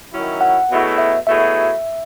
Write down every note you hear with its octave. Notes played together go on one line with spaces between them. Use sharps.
D#3 F#3 C#4 E4
F#5
B2 F#3 A3 E4 G#4
E5
B2 F#3 A3 E4 G#4 E5